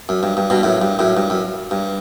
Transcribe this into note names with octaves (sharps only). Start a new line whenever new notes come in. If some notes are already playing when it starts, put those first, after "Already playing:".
F#2
G2
G2
G2 B2
F#2 A2
G2
F#2 A2
G2
F#2
G2